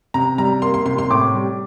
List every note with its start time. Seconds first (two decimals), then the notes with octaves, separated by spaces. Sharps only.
0.14 C3 A#5
0.38 G3 A#5
0.62 A#3 C6
0.74 C6
0.86 C3 C6
0.98 C6
1.10 A2 D6
1.34 G3